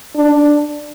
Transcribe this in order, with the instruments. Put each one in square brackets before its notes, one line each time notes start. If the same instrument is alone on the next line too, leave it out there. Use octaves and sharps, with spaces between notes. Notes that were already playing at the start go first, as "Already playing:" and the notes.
[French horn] D4